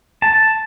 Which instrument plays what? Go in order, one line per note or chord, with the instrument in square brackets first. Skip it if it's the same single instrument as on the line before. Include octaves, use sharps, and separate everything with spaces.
[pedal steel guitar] A5